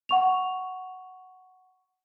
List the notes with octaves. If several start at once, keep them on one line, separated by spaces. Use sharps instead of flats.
F#5 C#6 F7